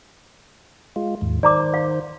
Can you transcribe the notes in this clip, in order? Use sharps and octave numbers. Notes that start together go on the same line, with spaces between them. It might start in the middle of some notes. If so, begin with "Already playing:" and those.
G#3 F4
D#2 G#2
D#3 C5 D5 A#5 D6
F5